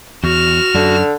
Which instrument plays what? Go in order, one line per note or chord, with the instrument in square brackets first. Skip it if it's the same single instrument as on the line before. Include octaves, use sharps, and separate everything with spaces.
[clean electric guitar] E2 [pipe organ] F#4 [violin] F6 E7
[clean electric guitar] F#2 [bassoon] D3